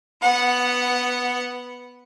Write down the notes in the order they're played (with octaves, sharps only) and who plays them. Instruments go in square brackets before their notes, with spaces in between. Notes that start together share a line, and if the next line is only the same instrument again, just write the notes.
[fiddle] B3 F#5